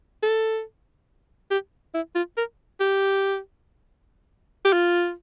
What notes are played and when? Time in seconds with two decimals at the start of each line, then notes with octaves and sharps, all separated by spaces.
0.23 A4
1.51 G4
1.94 E4
2.15 F4
2.37 A#4
2.80 G4
4.65 G4
4.73 F4